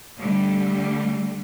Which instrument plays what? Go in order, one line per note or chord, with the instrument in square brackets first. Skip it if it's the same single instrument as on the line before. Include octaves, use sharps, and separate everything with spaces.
[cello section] D3 G3 A3